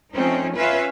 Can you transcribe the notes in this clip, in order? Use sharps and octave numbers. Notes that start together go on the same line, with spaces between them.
F3 A3 C4 C#4 D#4
C#4 F4 B4 E5 F5